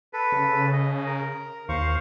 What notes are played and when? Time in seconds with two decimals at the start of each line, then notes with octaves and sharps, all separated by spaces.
0.13 A4 B4
0.32 C#3
0.73 D#5
1.06 A#4
1.69 D#2 C5 F5 C#6